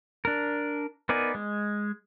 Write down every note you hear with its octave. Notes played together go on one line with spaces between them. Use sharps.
D4 A#4
B3 D#4 A#4 D5 G#5
G#3